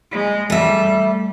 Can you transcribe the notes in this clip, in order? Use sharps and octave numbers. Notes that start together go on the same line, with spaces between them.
G#3
G3 A3 E5